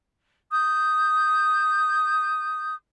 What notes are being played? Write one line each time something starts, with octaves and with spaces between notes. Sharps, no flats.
D#6 G6